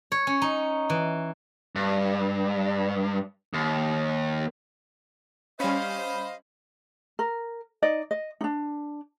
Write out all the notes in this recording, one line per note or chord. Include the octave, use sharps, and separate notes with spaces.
C#5
C#4
D#4
E3
G2
D#2
G3 C#4 C5 D#5 F5 B5
A#4
D#4 D5 D#5
D#5
D4 D#4